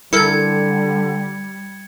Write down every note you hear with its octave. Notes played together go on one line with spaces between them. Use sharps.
D3 G3 E4 A4 A#4 G#6 C#7